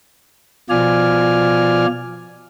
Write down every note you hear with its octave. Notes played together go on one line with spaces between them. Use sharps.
B2 F3 F4 D5 G#5 F6